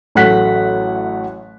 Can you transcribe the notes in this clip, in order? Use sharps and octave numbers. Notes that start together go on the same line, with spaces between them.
A1 F#3 A3 F#5 F#6 B6